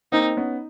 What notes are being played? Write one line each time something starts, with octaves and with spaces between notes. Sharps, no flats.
A#3 C4 D#4
B3 C#4